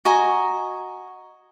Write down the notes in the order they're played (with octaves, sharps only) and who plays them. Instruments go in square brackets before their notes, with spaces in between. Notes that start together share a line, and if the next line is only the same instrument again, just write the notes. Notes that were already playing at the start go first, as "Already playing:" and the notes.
[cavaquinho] F#4 D#5 G#5 A#5